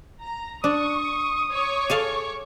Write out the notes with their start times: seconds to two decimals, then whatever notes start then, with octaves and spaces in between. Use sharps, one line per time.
0.22 A#5
0.64 D4 C#6 D#6
1.51 C#5 C#6 D6
1.90 G#4 A4 F5